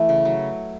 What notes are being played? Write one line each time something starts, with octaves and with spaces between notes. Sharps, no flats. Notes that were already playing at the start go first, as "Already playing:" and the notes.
Already playing: E3 A3
C#3
F#3